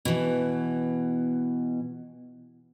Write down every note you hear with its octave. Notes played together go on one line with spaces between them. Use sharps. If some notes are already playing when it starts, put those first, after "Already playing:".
B2 E3